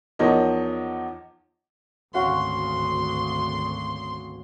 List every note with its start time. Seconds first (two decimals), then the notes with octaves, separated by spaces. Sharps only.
0.19 E2 F3 D#4 A#4 C#5 D#5
2.14 G#1 D2 C#4 F#4 F5 C6